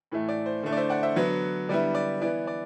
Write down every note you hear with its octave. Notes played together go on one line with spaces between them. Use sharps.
A2 E3 A3
D5
C5
D3 A3 E4
D5
C5 E5
D5 F#5
C5 E5
D3 F#3 B3
D3 G3 B3 E4 D5
D5
E3 B3 E4 D5
D5